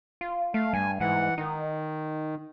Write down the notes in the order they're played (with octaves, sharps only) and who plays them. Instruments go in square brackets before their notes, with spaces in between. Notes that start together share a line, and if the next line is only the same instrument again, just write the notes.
[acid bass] F4
[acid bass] A3 [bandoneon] F5
[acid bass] G2 [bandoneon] G#5
[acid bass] G#2 [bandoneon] E3 F#5
[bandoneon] D#3 [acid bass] D#4